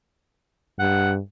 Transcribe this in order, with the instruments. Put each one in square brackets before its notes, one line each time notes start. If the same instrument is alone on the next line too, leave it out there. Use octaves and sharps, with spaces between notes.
[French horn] G2 [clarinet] F#5